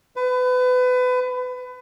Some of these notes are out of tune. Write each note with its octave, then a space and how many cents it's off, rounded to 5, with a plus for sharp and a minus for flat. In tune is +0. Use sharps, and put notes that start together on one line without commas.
B4 +30